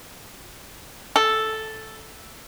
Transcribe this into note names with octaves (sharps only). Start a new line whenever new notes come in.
A4